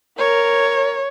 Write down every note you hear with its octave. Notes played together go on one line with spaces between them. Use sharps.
A#4 C#5